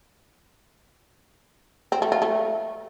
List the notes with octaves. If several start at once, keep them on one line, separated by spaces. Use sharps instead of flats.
C4
A3
F4
A3